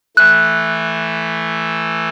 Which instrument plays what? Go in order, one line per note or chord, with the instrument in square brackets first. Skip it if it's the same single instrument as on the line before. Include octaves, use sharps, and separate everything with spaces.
[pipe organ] E3 A3 [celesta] F#6